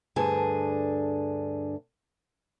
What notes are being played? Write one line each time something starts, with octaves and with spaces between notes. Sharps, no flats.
D2 G2 D3 D4 G#4